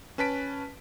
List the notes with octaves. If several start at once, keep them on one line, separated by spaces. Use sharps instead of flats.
C#4 B4 A5 B6 D7